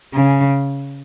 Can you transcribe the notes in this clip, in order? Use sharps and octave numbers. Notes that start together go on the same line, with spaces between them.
C#3